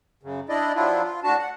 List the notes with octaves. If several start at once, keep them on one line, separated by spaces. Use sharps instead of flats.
F#2 C#3
D4 E4 D5 D#5
F3 F#3 D4 E4 F4
F4
A2 D4 F#4 A5
F#5